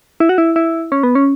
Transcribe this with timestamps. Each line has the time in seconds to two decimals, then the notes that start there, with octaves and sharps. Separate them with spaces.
0.20 E4
0.29 F#4
0.38 E4
0.56 E4
0.92 C#4
1.03 B3
1.15 C#4